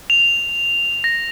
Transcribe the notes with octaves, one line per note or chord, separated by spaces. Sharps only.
F7
A#6